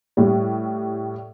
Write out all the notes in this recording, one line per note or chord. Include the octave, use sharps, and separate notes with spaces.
A2 G3